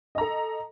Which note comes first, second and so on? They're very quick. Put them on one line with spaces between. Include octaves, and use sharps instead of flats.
D#5 A#5 A4